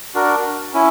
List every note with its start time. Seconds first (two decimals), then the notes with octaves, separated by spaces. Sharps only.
0.15 D4 F#4 A#4
0.74 C#4 E4